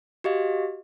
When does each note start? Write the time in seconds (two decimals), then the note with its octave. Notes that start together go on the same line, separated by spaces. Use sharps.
0.24 F#4 G4 D#5 F5